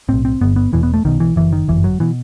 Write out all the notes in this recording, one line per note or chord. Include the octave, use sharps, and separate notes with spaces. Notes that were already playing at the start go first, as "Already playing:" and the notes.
B1 A2 C4
C4
G1 G2 B3
B3
E1 E2 B2 E3
B3
A3
B1 B2 D#3
E3
F#1 F#2 E3
D#3
G1 F#2 E3
F#3
B2 E3